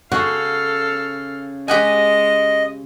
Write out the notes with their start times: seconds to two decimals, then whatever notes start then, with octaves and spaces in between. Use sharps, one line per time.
0.12 C#3 F#4 A4 F5
1.68 G#3 G4 D#5 F#5 G#5